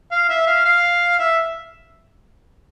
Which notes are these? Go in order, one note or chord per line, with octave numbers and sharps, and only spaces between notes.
F5
E5
F5
F5
E5